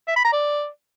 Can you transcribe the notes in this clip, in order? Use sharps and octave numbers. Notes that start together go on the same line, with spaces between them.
E5
B5
A#5
D5